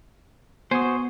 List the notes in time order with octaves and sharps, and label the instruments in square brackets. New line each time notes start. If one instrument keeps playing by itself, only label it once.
[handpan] B3 [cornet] F#4 [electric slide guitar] C5 [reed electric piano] G#5 C#6 D#6